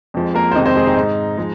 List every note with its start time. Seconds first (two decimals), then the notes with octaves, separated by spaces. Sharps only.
0.14 F2 F3 G#3
0.35 A#3 A#4
0.52 C5
0.55 F2 C3 D#3 G#3 D#4 D#5
0.66 C4 C5
0.76 G#3 G#4
0.87 D#4
0.96 G#2 G#3
1.38 F3 G#3